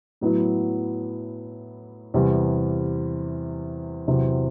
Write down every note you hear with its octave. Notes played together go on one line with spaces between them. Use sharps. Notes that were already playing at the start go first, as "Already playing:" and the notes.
A2 F#3 B3 E4
E2 C3 E3 G3
E2 C3 F#3 C4